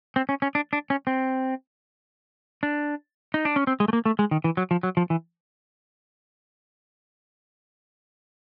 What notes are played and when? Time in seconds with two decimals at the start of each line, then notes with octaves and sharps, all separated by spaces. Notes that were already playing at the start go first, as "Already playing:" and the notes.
0.16 C4
0.29 C#4
0.42 C#4
0.55 D4
0.73 D4
0.90 C#4
1.07 C4
2.63 D4
3.34 D#4
3.45 D4
3.56 C#4
3.67 C4
3.80 G#3
3.88 A3
3.93 A#3
4.06 A3
4.19 G#3
4.31 D#3
4.44 E3
4.57 F#3
4.71 F3
4.83 F#3
4.97 F3
5.10 E3